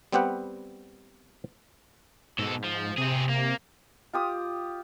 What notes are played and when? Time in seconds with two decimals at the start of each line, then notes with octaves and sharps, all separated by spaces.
0.13 G3 B3 C4 G4 F#5
2.39 G#2 B2 A4
2.64 F3
2.98 C3 C4 G#4
3.29 A#3
4.13 F4 G4 D#6